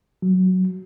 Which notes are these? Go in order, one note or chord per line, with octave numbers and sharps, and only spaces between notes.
F#3